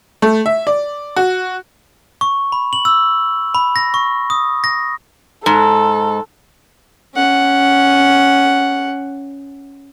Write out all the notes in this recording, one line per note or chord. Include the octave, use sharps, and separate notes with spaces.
A3
E5
D5
F#4
C#6
B5
F#7
E6
B5
A#6
C#6
D#6
A#6
G#2 A4
C#4 F#5